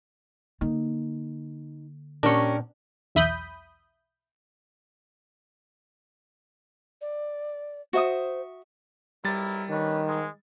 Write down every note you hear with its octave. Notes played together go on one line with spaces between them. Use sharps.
D3 A#3 D#4
A#2 C#4 D4 G4 A#4
B1 E2 E5 B5 D#6 G6
D5
F#4 C5 E5 D#6
B1 G3 E4 A#4 A6
D#3 C#4 D4 B4
G#2 G#3